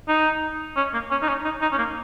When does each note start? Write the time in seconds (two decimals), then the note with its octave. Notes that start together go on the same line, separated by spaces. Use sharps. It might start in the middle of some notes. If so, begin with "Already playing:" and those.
0.08 D#4
0.77 C#4
0.93 A#3
1.11 C#4
1.22 D#4
1.28 C#4
1.45 D#4
1.62 D#4
1.72 C#4
1.78 A#3